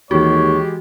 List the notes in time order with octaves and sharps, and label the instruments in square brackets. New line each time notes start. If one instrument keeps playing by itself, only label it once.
[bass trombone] D#2 [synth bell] E3 F#4 [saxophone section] G#3 G4 [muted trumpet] C#5